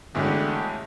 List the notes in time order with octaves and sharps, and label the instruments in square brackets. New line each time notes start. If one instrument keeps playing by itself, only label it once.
[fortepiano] A1 [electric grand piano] B2 G#3 A3 [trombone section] D3 [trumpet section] E4 G4 F#5